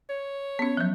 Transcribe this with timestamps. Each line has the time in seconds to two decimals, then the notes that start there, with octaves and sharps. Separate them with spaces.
0.09 C#5
0.59 B3 C#4
0.77 F3 F#3